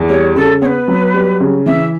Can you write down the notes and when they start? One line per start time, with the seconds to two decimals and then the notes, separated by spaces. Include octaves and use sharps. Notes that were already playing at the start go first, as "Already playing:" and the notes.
Already playing: E2
0.09 G3 C#5
0.36 C#3 A4
0.61 B3 B4 C#5
0.88 F#3
1.14 G3
1.40 C#3
1.66 E3 E5